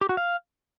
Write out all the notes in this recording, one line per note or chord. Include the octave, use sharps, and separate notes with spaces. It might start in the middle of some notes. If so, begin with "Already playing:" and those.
G4
F#4
F5